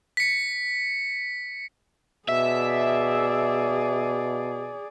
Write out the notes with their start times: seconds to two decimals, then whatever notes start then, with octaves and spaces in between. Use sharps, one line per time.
0.17 B6 C#7
2.28 B2 G#4 D5 E5